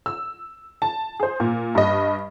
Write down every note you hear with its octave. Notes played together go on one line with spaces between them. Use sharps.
E6
A5
G#4 C5
A#2
G2 D#5